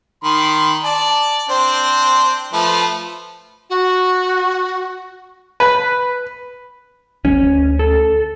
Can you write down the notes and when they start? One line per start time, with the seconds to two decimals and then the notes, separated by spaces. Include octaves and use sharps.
0.24 D#3 B5 C6
0.84 D5 A5
1.49 C4 D4 C5
2.53 F3 A3 B4
3.69 F#4
5.60 B4
7.25 D2 C#4
7.79 A4